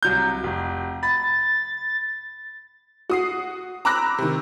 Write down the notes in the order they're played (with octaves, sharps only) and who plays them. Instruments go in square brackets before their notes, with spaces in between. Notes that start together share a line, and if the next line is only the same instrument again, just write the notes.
[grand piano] C2 F#3 G6
F1
[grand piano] B5 [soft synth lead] A6
[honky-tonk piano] F#4 D#6 C7
A#5 B5 D6 E6 F#6 A#6
C3 D#3